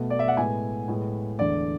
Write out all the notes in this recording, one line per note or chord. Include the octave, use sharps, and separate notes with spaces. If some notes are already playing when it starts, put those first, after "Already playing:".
Already playing: B2 A3
D5
E5
F#5
A2 G#3 B3 G#5
A2 G#3 B3
E2 D3 A3 D5